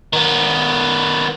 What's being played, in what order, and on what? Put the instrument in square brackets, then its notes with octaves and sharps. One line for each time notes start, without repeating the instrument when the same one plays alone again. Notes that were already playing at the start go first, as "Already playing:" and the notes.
[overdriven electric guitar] D#3 B3